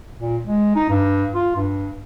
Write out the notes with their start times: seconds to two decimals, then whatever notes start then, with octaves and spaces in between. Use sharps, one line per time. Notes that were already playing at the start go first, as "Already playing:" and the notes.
0.19 A#2
0.47 G#3
0.76 D#4
0.90 G2
1.35 F4
1.56 G2